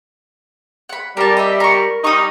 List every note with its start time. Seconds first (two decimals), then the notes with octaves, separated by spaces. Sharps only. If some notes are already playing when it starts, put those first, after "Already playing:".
0.89 F#5 B5
1.17 G3 A#4 A5
1.37 D#5 E5
1.60 A#4 C#6
2.04 G3 D#4 C#6 D#6